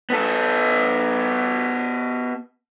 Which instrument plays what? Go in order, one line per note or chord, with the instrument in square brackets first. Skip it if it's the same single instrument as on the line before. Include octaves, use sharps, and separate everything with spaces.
[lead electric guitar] B3 A4